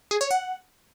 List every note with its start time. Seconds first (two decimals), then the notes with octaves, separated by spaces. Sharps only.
0.11 G#4
0.21 C#5
0.31 F#5